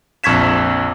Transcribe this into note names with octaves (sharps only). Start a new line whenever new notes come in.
A#1 F2 C#6 G#6 B6 E7